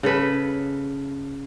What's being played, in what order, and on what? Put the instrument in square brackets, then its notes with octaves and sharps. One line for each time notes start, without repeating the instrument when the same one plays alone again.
[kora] C#3 A4 B4